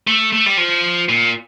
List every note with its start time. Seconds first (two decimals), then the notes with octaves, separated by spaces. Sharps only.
0.07 A3
0.32 A3
0.46 G3
0.58 F3
1.09 A#2